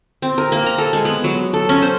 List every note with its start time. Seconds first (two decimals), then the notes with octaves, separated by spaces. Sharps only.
0.22 C4
0.38 A#4
0.52 A#3
0.66 A#5
0.78 A4
0.93 G#3
1.05 B3
1.24 F#3
1.53 A4
1.69 C#4
1.82 C5